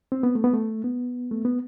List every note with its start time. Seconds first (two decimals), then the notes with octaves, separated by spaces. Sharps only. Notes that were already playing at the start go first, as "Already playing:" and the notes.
0.12 C4
0.23 B3
0.35 A3
0.44 B3
0.53 A3
0.84 B3
1.31 A3
1.45 B3